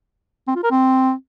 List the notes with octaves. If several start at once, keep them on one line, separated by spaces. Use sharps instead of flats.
C4
F4
A#4
C4